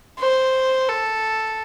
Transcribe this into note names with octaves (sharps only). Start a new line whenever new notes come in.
C5
A4